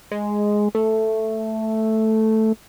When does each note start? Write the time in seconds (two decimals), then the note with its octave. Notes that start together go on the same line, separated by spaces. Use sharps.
0.11 G#3
0.75 A3